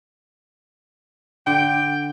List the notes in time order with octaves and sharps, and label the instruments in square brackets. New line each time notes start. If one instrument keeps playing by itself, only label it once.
[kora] D3 [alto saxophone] G5